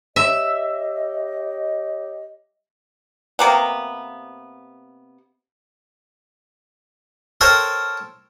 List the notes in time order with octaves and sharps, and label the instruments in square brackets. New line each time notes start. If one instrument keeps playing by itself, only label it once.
[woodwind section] G4 C#5 D#5 [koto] E5
[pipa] C3 A#3 B3
[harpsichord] A4 A#4 C5 C#5 G5 A#5